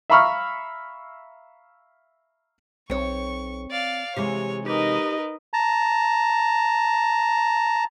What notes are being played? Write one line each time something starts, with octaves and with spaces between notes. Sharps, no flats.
E5 F5 A#5 B5 C#6 F6
B1 C4 C#5 C#6
D5 F5
C3 E3 G#3 G4 C#5
D#4 G4 A#4 B4 D#5
A5 A#5